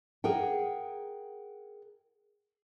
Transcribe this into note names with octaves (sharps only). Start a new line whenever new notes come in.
G#4 A#4 F#5 G5